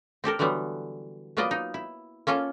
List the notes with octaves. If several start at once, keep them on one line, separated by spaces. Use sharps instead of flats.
C4 G4 A4 A#4
D3 E3 F#3 G3 B3
F#3 A#3 B3 F4 D5 D#5
D#4
E4
A#3 C#4 F4 A4